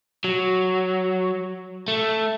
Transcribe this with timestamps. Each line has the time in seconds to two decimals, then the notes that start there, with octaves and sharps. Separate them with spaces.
0.24 F#3
1.88 A3